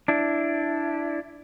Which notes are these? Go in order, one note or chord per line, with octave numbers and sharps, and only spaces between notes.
D4 E4